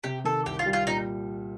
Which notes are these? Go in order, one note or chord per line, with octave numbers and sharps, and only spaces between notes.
C3 G4
D#3 A4
C2 G4
F4
G3
F4
A#2 D#4